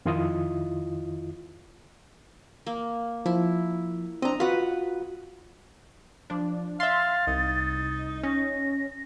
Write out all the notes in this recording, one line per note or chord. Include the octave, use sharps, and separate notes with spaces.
F2 D#3 E4 F4 D#5 D#6
A#3
F3 E4
C4 D4 D#5 A#5
F4 F#4 B4 F#5
F3 D4
E5 F5 C6 A6
C2 D#4
C#4 A#6